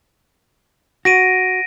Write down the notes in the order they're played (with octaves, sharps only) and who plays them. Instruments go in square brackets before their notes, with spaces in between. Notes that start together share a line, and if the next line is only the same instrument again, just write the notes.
[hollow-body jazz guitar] F#4 [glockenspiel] A#6 D7 D#7